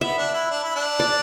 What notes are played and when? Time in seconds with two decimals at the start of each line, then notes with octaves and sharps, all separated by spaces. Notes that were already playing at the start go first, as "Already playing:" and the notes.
0.01 B3 E5
0.18 D4
0.34 E4
0.51 D4
0.63 E4
0.75 D4
1.00 D5